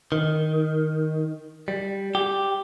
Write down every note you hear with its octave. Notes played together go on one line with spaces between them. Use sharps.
D#3
G3
G4